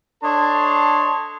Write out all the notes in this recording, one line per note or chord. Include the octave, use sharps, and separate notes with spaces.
D4 A4 C#5 D#5 A5 C6